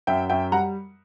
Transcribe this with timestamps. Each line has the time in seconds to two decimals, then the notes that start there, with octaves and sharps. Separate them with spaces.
0.07 F#2 E5 G5
0.30 F#2 E5 G5
0.52 G3 F#5 A#5